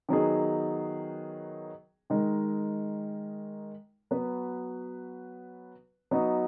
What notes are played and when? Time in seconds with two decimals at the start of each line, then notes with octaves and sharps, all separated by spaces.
0.09 D#3 F#3 B3 D#4 G#4
2.10 D#3 G#3 D#4 A#4
4.11 F#3 B3 F#4 B4
6.11 F#3 B3 D#4 F#4